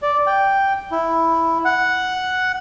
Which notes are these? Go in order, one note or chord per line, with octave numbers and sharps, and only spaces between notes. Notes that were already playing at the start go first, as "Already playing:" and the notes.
D5
G5
E4
F#5